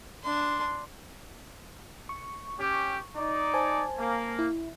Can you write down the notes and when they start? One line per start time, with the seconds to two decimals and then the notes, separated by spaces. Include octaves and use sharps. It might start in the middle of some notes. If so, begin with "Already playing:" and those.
0.23 D4 C6
2.09 C#6
2.60 C#4 G4
3.16 D#4 D5
3.54 C5 G#5 A5
3.99 A#3
4.39 E4